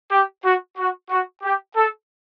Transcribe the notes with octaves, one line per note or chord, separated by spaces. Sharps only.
G4
F#4
F#4
F#4
G4
A4